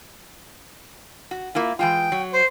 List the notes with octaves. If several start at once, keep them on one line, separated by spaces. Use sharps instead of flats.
F#4
A#3 E4 F4
E3 G#3 F4 G5
F#3
C5